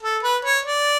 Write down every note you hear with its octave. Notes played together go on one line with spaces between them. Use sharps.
A4
B4
C#5
D5